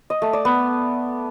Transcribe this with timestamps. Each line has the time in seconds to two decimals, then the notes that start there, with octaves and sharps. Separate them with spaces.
0.10 D#5
0.22 A3
0.33 D5
0.45 B3